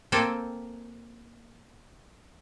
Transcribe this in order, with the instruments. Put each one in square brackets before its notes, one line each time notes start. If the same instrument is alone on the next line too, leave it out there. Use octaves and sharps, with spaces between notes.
[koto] A#3 C4 A4 G5 G#5